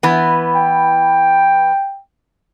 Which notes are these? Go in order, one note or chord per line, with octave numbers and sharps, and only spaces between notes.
E3 B3
G5